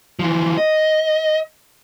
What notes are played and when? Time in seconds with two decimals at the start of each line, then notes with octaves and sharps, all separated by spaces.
0.19 E3 F3
0.58 D#5